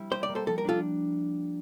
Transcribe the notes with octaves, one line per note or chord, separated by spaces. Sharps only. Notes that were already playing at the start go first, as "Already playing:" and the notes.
Already playing: G3 C4 E4
G4 C5
D5
A#3
A4 C5
F3 A4
A#4
D4 F4 A4